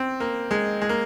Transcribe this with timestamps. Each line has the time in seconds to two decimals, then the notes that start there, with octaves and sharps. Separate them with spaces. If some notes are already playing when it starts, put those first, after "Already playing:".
Already playing: C4
0.20 A#3
0.51 G#3
0.81 G#3
0.89 A#3